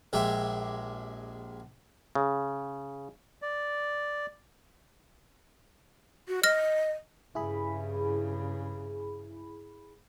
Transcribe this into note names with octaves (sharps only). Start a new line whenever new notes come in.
A#1 G#3 G4 E5
C#3
D5
F#4
D#5 F6 A#6
G2 C#3 E4 G#4 B5